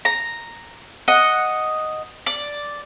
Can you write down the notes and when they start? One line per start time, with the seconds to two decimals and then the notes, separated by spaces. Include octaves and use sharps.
0.05 A#5
1.08 D#5 F#5
2.26 D5